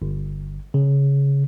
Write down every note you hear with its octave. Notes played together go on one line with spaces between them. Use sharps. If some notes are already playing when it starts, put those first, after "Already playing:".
G1
C#3